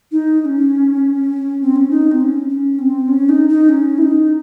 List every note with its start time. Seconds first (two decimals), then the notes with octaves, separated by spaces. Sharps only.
0.12 D#4
0.41 D#4
0.45 C#4
1.62 C4
1.76 C#4
1.90 D#4
2.12 C4
2.20 C#4
2.49 C#4
2.79 C4
3.08 C#4
3.29 D#4
3.49 D#4
3.69 C#4
3.98 E4
4.02 D#4